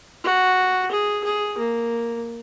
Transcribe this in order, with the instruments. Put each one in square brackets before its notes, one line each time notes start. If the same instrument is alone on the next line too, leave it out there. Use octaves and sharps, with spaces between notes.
[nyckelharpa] F#4
G#4
G#4
A#3